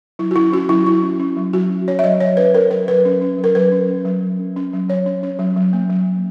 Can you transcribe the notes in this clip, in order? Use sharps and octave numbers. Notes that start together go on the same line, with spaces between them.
F#3 E4
F#4
C#4 E4
C#4 F#4
F#3 E4
F#3 E4
C#4
C#4
F#3
F#3 F#4
C#4
C#4 C#5
E5
F#3 D#5
F#3 C#5
C#4 B4
C#4 A#4
F#3 A#4
F#3 B4
C#4
C#4
F#3
A#4
F#3 B4
C#4
C#4
F#3
F#3
C#4
C#4
F#3
F#3 C#5
C#4
C#4
F#3
F#3
A#3
F#3
C#4